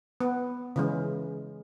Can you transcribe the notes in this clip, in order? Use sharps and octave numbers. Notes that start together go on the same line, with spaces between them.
B3
C#3 E3 G#3